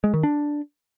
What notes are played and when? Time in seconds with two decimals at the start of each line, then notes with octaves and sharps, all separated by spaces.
0.04 G#3
0.14 D#3
0.23 D4